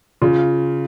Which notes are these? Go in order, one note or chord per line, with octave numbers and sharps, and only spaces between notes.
C#3 F4